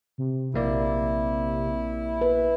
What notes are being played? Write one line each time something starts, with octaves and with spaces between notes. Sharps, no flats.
C3
A#1 A#3 E4 D5
B4